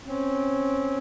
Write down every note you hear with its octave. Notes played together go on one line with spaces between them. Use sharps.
C4 C#4